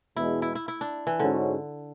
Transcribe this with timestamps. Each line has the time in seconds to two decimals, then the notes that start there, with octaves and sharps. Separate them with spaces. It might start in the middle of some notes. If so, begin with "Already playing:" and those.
0.16 E2 B2 G#3 E4
0.42 E4
0.55 E4
0.68 E4
0.81 D4
1.07 E3
1.20 G#2 D3 G#3 C#4 F#4